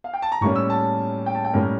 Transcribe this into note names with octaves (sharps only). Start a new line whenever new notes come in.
F5
G5
A5
A#5
A2 G3 A#3 C#4 C#6
E6
A5
G5
A5
G5
A2 G3 A#3 C#4 A#4